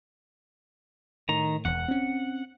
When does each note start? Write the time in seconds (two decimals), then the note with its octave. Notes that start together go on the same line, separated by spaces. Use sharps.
1.29 A2 D#3 A#5
1.65 E1 E2 F#5
1.88 C4 C#4